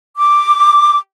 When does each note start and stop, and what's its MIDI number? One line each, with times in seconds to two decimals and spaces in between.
0.16 0.96 86